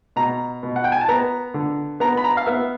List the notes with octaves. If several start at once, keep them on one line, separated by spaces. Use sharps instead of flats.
B2 A#5
B2
F#5
G5
G#5
A5
B3 A#5
D3
B3 A#5
B5
A#5
F5
B3 E5